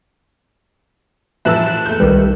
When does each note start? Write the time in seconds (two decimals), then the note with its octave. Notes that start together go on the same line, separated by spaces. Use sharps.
1.45 A2 E3 F3 E5 A5 E6 F#6 E7
1.66 F#6 E7
1.86 A3 G6
2.00 C2 D#3 G3 A#4 B4